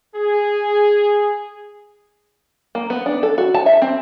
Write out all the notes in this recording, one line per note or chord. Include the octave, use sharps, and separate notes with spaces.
G#4
A#3
B3
D4
A4
F#4
A5
E5
C4